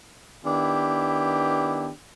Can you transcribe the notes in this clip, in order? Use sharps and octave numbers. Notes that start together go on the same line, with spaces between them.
D#3 B3 D4 E4 G4